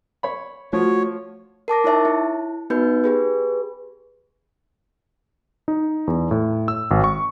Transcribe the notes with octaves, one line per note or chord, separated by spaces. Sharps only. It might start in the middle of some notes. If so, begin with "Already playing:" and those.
C#5 B5
F3 A3 F#4 C#5
A#4 A5 D6 A#6
D#4 E4 C#5 E5 A5
E4
B3 D#4 F#4 B4 G6
G4 G#4 B4
D#4
E2
A2
E6
G#1
C#6